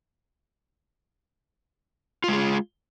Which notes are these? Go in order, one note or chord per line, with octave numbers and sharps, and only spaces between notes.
G#3 F4 G#4